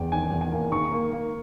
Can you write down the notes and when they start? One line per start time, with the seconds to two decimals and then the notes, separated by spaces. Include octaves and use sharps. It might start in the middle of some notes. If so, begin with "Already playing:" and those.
Already playing: E2 G5
0.12 D#3 G#5
0.31 E2
0.41 G#5
0.52 A#3
0.71 D#3 C#6
0.92 A#3
1.11 A#3